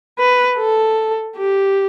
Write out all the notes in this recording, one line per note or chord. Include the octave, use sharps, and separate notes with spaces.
B4
A4
G4